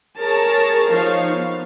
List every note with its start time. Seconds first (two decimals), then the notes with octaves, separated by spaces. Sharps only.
0.18 G#4 A#4 C#5 A5 A#5
0.88 F3 D#4 C#5 F5
1.31 B3